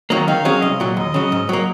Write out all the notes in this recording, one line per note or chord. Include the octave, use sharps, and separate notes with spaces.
D#3 F#3 A#3
D#3 F5
F#3 C#4 G#4
C2 D#5
A#2 F#3
D#2 D#5
C#3 F#3
G#2
F#3 A#3